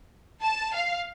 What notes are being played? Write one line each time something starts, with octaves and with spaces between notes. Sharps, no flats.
A5
F5